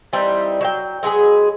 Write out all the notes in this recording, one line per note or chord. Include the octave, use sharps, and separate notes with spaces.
E3 G3 C4 D#4
F#3 G5
F#3 G#3 B3 G#4